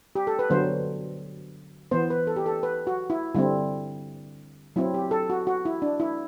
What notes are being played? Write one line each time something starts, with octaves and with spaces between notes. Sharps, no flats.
G4
A4
B4
D3 F#3 B3 C5
E3 B3 C5
B4
A4
G4
A4
B4
F#4
E4
D3 G3 C4 E4
F#3 C4 E4
G4
A4
F#4
F#4
E4
D4
E4